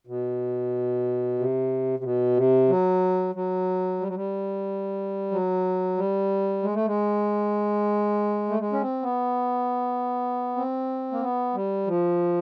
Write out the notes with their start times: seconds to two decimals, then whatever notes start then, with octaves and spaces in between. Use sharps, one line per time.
0.07 B2
1.39 C3
1.99 C3
2.04 B2
2.37 C3
2.69 F#3
3.35 F#3
4.01 G3
4.08 F#3
4.15 G3
5.31 F#3
5.97 G3
6.63 G#3
6.74 A3
6.86 G#3
8.49 A3
8.59 G#3
8.73 C#4
8.81 C4
9.02 B3
10.56 C4
11.12 A#3
11.21 B3
11.54 G3
11.87 F3